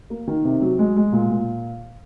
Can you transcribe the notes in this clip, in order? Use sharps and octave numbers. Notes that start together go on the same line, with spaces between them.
A#3
D#3
C3
F#3
G#3
G#3
A#2
A#2